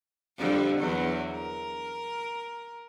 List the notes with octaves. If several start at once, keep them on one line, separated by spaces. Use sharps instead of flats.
F2 D3 G3
E2 F#3
A#4